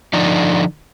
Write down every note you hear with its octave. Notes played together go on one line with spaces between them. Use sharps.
D3 F3 D#4 D5